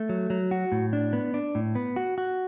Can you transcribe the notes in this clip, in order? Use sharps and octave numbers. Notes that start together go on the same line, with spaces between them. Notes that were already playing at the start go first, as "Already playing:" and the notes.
Already playing: A3
F#3
F#3
F#4
A2
D4
B3
D4
A2
B3
F#4
F#4